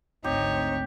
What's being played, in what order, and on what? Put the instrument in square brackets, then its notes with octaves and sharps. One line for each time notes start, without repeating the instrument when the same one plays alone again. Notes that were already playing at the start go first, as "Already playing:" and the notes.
[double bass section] G#1 D2 C4 [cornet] D#4 [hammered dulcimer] G4 [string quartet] C#5